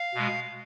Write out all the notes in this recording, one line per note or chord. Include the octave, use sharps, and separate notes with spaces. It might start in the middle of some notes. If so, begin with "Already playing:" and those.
Already playing: F5
B2 G#3